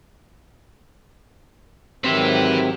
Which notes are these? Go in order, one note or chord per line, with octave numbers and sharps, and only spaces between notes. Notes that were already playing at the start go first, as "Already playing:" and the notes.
G#2 D#3 F#3 C4 G4 B4 E5